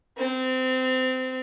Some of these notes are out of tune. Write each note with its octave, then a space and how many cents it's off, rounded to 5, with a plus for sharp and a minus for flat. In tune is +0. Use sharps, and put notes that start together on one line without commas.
C4 -25